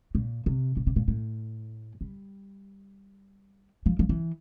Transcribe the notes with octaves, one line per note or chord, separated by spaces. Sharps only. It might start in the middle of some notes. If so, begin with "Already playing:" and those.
A#2
C3
A#2
C3
A#2
A2
G3
F3
F3
E3